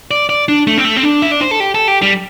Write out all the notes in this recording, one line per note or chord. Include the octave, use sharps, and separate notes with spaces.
D5
D5
D4
A3
C4
A3
C4
D4
E5
D5
C5
A4
G4
A4
G4
G3